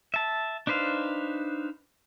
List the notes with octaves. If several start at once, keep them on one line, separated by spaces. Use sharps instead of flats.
E5 A5
D4 D#4 B4 C5 F5